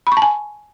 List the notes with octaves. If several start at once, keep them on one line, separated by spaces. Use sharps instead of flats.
B5
C#6
A5
G#5